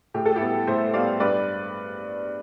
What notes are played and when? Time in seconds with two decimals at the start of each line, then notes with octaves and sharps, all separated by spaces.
0.14 A2 G4
0.25 A4
0.36 E4 G4
0.41 G3 B3
0.67 A2 C5 E5
0.93 G3 B3 D5 F5
1.20 G2 B4 D5